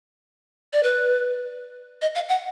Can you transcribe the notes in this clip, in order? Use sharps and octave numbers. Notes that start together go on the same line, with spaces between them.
D5
B4
D#5
F5
F#5